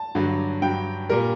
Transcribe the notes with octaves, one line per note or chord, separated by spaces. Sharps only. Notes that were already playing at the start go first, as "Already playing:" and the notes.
Already playing: A5
G2 D3 F#3
G2 F#3 G5
A#2 G3 A#4